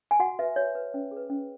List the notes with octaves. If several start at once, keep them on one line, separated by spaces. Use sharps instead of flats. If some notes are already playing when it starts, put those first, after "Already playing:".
G#5
F#4 F#5
B4 E5
F#4 C#5
B4
C#4
G#4 B4
C#4